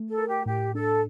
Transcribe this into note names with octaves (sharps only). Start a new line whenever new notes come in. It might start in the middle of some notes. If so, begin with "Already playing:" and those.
Already playing: A3
A4
A#4
G4
A2 G4
D4 A4